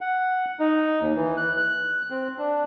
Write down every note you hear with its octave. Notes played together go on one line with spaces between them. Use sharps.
F#5
D#4
D#2
E3
F#6
F#6
C4
D4